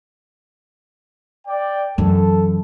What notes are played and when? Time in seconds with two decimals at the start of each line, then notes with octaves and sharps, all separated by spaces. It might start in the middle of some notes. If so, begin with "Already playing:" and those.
1.47 D5 G5
1.98 F#2 E3 A4